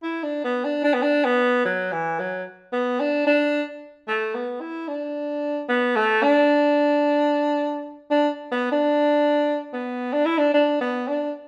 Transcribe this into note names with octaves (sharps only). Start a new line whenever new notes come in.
E4
D4
B3
D4
D4
B3
D4
B3
F#3
E3
F#3
B3
D4
D4
A3
B3
E4
D4
B3
A3
D4
D4
B3
D4
B3
D4
E4
D4
D4
B3
D4